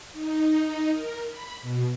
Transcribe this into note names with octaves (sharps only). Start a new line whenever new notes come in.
D#4
D#4
A#4
B5
B2